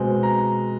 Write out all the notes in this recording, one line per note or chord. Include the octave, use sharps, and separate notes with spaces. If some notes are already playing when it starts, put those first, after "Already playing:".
Already playing: B2 G#3 C4
A#5